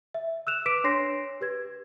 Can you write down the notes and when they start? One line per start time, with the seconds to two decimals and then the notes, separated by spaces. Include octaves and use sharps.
0.14 E5
0.47 E6 F#6 E7 F7
0.66 B4 D6 B6 D7 E7
0.84 D4 C#5 C6 A#6 C7
1.41 G4 B4 G#6